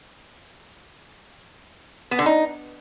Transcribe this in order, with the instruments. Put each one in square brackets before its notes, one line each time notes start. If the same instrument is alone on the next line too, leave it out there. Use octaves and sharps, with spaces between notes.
[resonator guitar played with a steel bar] B3
D3
D#4